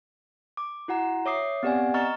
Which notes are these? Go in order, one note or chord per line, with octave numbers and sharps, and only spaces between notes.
D6
E4 F#4 F#5 A#5
C#5 E5 D6 D#6 C7
B3 C4 G4 D5 F#5 G#5
D#5 A#5 C#6 F6 A6